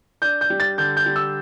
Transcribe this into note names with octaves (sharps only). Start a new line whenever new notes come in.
D4 G6
G6
G3
A6
D3 G6
G6
G3
E6